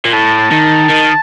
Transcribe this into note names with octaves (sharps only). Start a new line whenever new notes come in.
A#2
A2 A5
D#3
D#3